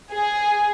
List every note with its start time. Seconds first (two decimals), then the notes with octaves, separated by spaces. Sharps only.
0.11 G#4